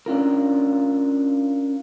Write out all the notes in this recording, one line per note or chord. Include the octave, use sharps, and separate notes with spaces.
C#4 D4 F4 A#4